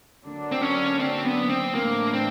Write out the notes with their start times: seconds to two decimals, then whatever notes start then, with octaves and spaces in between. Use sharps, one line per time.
0.24 D3 F#3 A#3 D4
0.52 C4
0.61 C#4
1.00 C4
1.25 B3
1.49 C4
1.75 A2 E3 A3 A#3 D4
2.13 C4